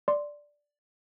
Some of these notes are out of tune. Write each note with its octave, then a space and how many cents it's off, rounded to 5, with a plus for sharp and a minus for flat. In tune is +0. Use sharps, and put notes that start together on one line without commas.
D5 +0 C6 +0